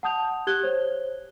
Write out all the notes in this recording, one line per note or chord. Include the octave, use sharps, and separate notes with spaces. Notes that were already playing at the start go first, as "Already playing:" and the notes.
F#5 A5 D#6 G6 F7
G4 F#6 G#6 G7
C5 C#5